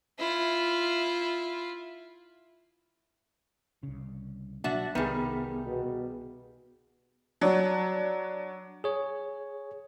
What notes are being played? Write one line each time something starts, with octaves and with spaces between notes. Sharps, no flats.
E4 F4
C2 C#3
B2 F#3 A#3 D4 F#4 E5
C2 D#3 G3 B3 G#4
B2
F#3 D4
G#4 C#5